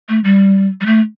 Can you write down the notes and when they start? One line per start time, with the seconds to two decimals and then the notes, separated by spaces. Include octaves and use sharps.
0.09 A3
0.24 G3
0.81 G3
0.86 A3